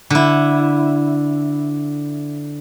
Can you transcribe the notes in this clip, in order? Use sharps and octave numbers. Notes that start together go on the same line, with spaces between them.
D3 E4